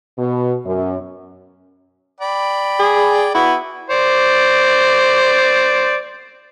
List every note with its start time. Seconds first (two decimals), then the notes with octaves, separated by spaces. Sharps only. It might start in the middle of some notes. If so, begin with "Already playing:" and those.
0.19 B2
0.66 F#2
2.20 D5 G5 B5
2.79 G#4
3.35 B3 E4 F#4
3.90 C5 D5